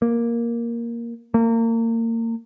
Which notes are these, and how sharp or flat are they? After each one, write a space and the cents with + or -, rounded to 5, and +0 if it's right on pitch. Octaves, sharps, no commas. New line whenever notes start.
A#3 +5
A#3 -30